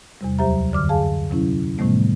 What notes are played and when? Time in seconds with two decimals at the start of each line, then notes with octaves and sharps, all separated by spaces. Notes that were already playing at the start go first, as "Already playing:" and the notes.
0.21 E2 C3 G3
0.39 D2 F#3 G4 C5 E5 A#5
0.72 F#2 D3 D6 F6
0.89 G#4 F5 G#5 A5
1.30 C3 F#3 C#4 E4
1.78 A2 C3 D#3 G3 A3 B3